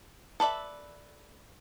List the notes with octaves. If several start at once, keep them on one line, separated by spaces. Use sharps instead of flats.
A4 B4 D5 E5